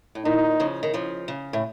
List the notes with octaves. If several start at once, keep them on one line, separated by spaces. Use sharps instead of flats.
A2
A#2 D#4
C#3 F3
D#3
C#3 F3
C#3
A2